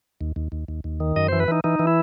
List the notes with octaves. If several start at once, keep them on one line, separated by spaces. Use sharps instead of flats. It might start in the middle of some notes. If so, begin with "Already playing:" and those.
D#2
D#2
D#2
D#2
D#2
D#3
F#2 D#5
E3 C5
B4
E3 D#4
E3 D#4
E3
E4